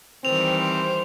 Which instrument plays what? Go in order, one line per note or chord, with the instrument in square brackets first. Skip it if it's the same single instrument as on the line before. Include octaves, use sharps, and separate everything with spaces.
[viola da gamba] D#3 E3 G3 [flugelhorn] C4 [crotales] F7
[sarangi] C5